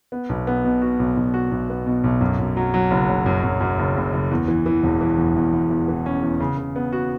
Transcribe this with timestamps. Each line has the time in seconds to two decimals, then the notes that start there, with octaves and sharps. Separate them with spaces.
0.12 B3
0.29 B1
0.47 B3
0.64 B2
0.82 F#4
0.99 B1
1.17 B1
1.34 F#4
1.51 B1
1.70 B3
1.86 B2
2.04 B1
2.21 F#2
2.39 F#2
2.57 F#3
2.74 F#3
2.91 F#1
3.09 F#1
3.26 F#2
3.44 F#2
3.61 F#2
3.79 F#1
3.97 F#1
4.13 F#1
4.31 E2
4.48 E3
4.66 E3
4.83 E1
5.01 E3
5.18 E2
5.36 E2
5.53 E2
5.71 E2
5.88 E3
6.06 C#4
6.23 E2
6.40 C#3
6.57 C#3
6.76 B3
6.93 F#4